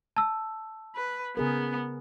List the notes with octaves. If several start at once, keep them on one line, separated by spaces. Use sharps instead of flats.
A5 E6
B4
C#3 B3 G#4 A#4